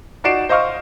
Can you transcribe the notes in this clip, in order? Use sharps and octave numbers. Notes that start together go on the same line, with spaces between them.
D#4 F#4 D5 C7 D7 E7
C5 D#5 F5 C#6 F6